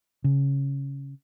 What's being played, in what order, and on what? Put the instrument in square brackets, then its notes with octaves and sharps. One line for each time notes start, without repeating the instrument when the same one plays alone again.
[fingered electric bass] C#3